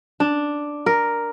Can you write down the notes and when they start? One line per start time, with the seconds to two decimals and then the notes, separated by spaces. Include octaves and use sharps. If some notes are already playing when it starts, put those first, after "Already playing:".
0.20 D4
0.86 A#4